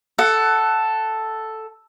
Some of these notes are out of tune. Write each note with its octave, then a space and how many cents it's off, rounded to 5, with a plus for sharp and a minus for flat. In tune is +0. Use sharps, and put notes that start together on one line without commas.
A4 +0 F#5 +15